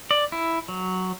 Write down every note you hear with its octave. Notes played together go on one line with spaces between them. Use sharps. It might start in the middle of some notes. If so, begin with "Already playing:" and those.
D5
E4
F#3